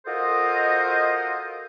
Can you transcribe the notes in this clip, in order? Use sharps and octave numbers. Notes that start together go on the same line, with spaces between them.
F4 F#4 A4 A#4 C5 D#5